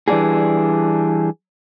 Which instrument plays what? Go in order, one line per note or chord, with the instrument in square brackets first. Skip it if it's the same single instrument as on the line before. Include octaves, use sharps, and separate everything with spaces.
[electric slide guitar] E3 G3 C#4 D4 F#4 G#4